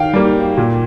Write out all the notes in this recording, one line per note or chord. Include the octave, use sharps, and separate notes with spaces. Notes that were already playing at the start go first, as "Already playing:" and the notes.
Already playing: D#3 F5 G5
G3 A#3
A#2